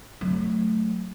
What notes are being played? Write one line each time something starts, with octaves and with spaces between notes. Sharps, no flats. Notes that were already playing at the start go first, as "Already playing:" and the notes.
F#3 A3